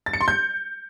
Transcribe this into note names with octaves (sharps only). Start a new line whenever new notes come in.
A6
C#7
C6
G6